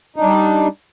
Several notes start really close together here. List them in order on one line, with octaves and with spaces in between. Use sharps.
D#4 D4 G3